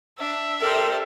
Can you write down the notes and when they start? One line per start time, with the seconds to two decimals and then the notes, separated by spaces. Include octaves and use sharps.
0.18 D4 E5
0.60 G4 A4 A#4 C5 D5